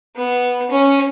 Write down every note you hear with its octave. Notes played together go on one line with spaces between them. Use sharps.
B3
C#4